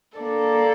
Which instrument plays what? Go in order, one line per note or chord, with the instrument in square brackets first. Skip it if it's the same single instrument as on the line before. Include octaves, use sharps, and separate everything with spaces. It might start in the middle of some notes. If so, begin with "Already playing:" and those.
[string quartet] A#3 D4 A4 D5